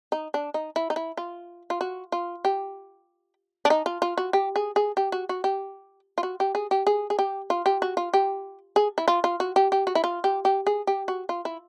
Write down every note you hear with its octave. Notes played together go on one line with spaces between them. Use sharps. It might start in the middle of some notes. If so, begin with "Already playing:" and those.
D#4
D4
D#4
E4
D#4
E4
F4
F4
F#4
F4
G4
D4
D#4
F4
F4
F#4
G4
G#4
G#4
G4
F#4
F#4
G4
F4
F#4
G4
G#4
G4
G#4
G#4
G4
F4
G4
F#4
F4
G4
G#4
E4
F4
F4
F#4
G4
G4
F#4
E4
F4
G4
G4
G#4
G4
F#4
F4
E4